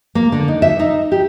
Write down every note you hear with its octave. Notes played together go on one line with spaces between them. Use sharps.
A#3
D3
D#4
E5
D#4
G4